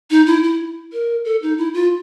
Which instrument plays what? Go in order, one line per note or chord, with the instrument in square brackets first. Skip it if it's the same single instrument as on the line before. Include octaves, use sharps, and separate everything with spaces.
[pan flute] D#4
E4
E4
A#4
A4
D#4
E4
F4